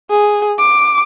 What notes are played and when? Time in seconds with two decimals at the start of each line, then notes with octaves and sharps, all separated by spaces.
0.10 G#4
0.59 D6